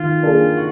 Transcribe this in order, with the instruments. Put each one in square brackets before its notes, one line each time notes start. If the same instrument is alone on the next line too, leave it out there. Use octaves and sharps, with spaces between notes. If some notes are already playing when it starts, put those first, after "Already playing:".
Already playing: [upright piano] D#3 [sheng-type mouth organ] F4
[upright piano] A#3 D4 G#4
[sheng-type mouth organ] F#4